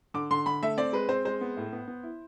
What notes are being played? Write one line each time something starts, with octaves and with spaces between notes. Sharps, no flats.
D3 D6
D3 C6
D3 B5
A3 E5
C4 D5
G#3 B4
C4 C5
G#3 C5
B3
A2
B3
B3
E4